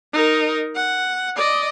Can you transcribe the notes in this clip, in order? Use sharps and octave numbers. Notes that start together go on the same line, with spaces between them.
D#4 A#4
F#5
D5 D#5